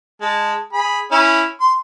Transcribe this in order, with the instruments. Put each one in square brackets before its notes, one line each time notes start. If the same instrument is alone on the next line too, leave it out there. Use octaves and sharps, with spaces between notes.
[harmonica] G#3 A5
G#4 B5
C#4 E4
C6